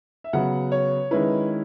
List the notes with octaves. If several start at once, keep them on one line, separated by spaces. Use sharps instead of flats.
E5
C#3 F#3 B3 F#5
C#5
D#3 G#3 C#4 E4 B4